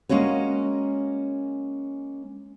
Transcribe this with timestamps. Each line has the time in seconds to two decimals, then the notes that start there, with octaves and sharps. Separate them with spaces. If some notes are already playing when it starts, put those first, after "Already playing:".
0.09 G#3 A#3 C#4 F#4 C#5